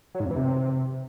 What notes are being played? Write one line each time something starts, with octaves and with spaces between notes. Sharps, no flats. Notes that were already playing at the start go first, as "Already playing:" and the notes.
F#3
G#2
F2
E3
C3